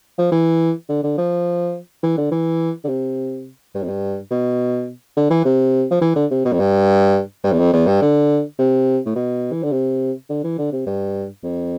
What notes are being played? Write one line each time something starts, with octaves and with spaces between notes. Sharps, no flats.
F3
E3
D3
D3
F3
E3
D3
E3
D3
C3
G2
F2
G2
B2
D3
E3
C3
F3
E3
D3
C3
B2
F2
G2
G2
E2
F2
E2
G2
D3
C3
A2
B2
E3
D3
C3
D3
E3
D3
C3
G2
F2